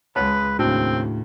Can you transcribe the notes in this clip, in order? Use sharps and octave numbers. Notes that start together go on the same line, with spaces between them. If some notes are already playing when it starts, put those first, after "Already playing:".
C#2 G#3 B4 C#5 F5 A5
D#2 A2 C#3 C4 D4 F#4